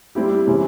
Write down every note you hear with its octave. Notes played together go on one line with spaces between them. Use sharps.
G3 C4 E4 G4
C3 E3 G#3 C#4